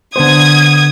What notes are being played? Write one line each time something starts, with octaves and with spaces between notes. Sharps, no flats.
D3 B3 C5 D#6 G#6